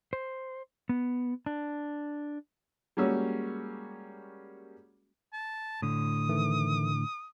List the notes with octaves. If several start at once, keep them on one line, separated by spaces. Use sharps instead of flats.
C5
B3
D4
G3 G#3 A#3 C#4 F#4 E6
A5
A2 D3 D#6
D#3 E3 A3